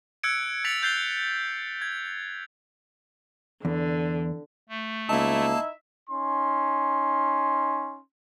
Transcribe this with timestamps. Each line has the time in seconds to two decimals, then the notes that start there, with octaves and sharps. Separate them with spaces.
0.23 E6 F#6 G#6 C#7 D7
0.64 G#6 A6 B6 C#7 F7 F#7
0.82 F#6 G6 A6 C7 F7 G7
1.82 G#6
3.65 E2 D3
4.69 A3
5.09 C#2 A#3 D#4 E4 E5 A5
6.10 C#4 D#4 C6